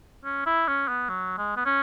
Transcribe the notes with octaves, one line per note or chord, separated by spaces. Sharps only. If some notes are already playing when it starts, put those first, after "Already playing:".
C#4
E4
C#4
B3
F#3
G#3
B3
C#4